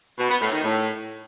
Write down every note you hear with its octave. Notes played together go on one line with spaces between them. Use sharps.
B2
B3
A2
D#3
A2